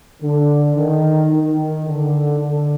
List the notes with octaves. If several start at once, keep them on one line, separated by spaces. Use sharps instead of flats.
D3
D#3
D#3
D3
D3